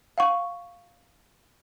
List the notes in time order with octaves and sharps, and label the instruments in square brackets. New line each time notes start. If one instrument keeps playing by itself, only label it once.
[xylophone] F5 F#5 C#6